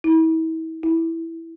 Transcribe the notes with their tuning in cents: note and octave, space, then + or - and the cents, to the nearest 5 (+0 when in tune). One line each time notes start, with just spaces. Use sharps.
E4 -40
E4 +0